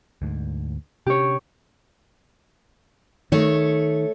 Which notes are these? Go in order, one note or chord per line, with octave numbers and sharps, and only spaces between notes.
D2 G#2
C3 C#4 D4 G4 C#5
D#3 A3 C#5